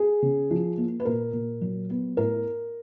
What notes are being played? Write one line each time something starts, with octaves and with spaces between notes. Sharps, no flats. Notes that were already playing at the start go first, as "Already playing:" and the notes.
Already playing: G#4
C#3
F3
A#3
B4
A#2 A#4
A#2
F#3
B3
A2 A#4